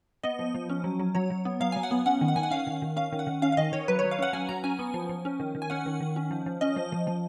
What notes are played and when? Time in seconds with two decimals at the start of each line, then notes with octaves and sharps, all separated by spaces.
0.23 B3 D#5
0.39 F3
0.54 F3
0.70 C#4
0.84 F#3
1.00 F#3
1.15 F#3 C#5
1.30 F#3
1.45 B3
1.60 F#3 F5
1.72 F#3 G#5
1.83 F#5
1.91 B3
2.06 C#4 F#5
2.21 D#3
2.28 F#5
2.36 D#3 G#5
2.43 F#5
2.51 C#4 F5
2.67 D#3
2.82 D#3
2.96 C#4 F5
3.12 D#3
3.19 F#5
3.27 D#3
3.42 C#4 F5
3.52 F5
3.57 D#3 D#5
3.72 D#3 C#5
3.88 F#3 B4
3.99 C#5
4.04 F#3
4.11 F5
4.19 C#4 F#5
4.33 F#3 G#5
4.49 F#3 A#5
4.64 C#4 G#5
4.79 B3
4.94 F3
5.09 F3
5.25 C#4
5.40 D#3
5.55 D#3
5.62 G#5
5.70 C#4 F#5
5.86 D#3
6.00 D#3
6.16 C#4
6.31 F3
6.46 F3
6.61 C#4 D#5
6.76 F3
6.92 F3
7.07 F3